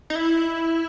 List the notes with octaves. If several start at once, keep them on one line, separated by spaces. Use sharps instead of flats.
D#4
E4